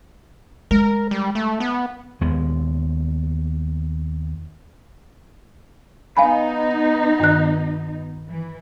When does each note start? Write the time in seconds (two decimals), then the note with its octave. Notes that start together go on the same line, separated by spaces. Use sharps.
0.71 G#3 A#4
1.11 G3
1.35 A3
1.60 B3
2.21 D#2 G#3 B3
6.17 B3 D#4 F5 G#5 B5
7.20 G2 D#3 F#6
8.29 E3